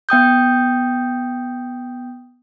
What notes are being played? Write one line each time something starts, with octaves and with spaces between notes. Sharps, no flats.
B3 G5 D#6 G6